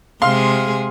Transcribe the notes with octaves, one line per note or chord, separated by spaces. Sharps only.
C3 G#3 G#4 F5 C6